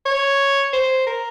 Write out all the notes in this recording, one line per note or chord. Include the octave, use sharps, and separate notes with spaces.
C#5
C5
A#4